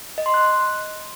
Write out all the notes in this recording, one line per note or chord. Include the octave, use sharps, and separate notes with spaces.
D#5
C6
F#6